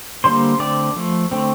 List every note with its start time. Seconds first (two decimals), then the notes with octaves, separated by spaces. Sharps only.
0.24 D3 G3 A#3 C5 C6
0.60 D3 A3 C4 D5 D6
0.96 F3 A3
1.31 D3 A3 C4